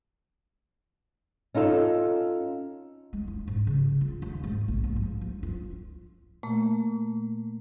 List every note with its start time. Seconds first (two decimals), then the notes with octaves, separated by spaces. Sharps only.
1.55 C#4 D#4 F4 A4
3.13 G#3
3.28 E4
3.48 G#2
3.67 C#3
4.01 F4
4.22 D#2
4.44 G#2
4.68 A#1
4.84 G#2
4.96 F3
5.21 F3
5.43 F4
6.43 A#2 A3 A#3